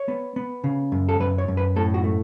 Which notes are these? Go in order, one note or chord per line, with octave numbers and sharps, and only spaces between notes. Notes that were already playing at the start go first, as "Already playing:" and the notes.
Already playing: C#5
B3
B3
C#3
F#2
A4
F#2 B4
C#5
F#2
B4
A2 A4
F#4
A3